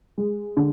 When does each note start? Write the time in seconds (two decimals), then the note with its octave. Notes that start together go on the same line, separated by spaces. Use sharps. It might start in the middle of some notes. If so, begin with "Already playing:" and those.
0.18 G#3
0.57 D3